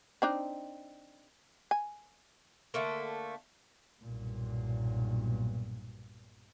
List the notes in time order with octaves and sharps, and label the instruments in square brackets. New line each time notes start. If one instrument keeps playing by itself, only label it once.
[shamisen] C4 D4 D#4
G#5
[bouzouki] D3 A3 A#3
[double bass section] B1 G2 A#2